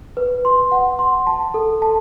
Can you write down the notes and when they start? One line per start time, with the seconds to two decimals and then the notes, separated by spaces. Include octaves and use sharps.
0.17 B4
0.45 C6
0.72 F#5
0.99 C6
1.27 A5
1.54 A4
1.82 A5